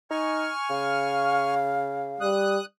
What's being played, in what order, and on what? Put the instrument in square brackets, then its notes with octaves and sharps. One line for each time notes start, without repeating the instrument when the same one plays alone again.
[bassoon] D#4 [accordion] G#5 C#6 F6
[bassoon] C#3 [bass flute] F5
[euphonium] G3 [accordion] D#6 F#6